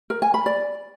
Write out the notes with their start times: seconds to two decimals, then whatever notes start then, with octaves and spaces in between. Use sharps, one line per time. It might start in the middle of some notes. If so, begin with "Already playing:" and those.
0.10 A#4
0.22 G#5
0.34 B5
0.46 D5